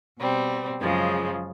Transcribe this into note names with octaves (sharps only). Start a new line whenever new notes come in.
B2 G3 C4
F#2 C#3 F3 G#3